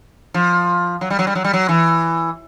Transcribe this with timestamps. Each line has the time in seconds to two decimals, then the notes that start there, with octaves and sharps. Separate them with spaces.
0.34 F3
1.01 F#3
1.10 G3
1.19 F#3
1.27 G3
1.35 F#3
1.44 G3
1.53 F#3
1.69 E3